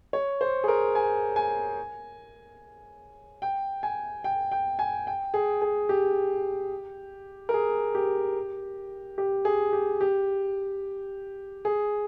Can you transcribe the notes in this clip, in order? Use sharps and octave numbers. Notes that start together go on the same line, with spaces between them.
C#5
C5
G#4
A#4
G#5
G#5
G5
G#5
G5
G5
G#5
G5
G#4
G#4
G4
A#4
G#4
G4
G4
G#4
G4
G4
G#4